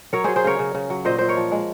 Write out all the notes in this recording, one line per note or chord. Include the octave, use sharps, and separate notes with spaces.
F#3 A#4 C#5
F#3 G#4 C5
G#4 C5
C#3 A#4 C#5
C#3
C#3
F#3
A#2 C5 D#5
A#2 C5
A#4 C#5
F3
G#3